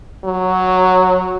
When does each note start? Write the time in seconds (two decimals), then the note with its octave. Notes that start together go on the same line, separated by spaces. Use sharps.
0.25 F#3